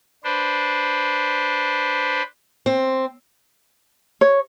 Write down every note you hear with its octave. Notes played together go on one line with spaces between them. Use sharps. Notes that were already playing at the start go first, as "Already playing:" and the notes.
D4 B4 C5
C4
C#5